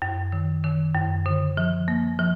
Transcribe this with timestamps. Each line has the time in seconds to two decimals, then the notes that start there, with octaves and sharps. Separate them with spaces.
0.02 F#2
0.32 D#3
0.64 D#3
0.95 F#2
1.26 D3
1.57 F3
1.88 A#3
2.19 F3